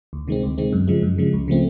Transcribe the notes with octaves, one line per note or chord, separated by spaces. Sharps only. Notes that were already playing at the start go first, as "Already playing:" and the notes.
D2
C3 D#3 G#3 C4
D2
C3 D#3 G#3 C4
F#2
C#3 F3 G#3
F#2
C#3 F3 G#3
C#2
C#3 F3 A3 C4